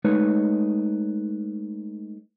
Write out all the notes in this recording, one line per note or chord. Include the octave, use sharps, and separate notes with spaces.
G#3 A3 D#4 B4 C#5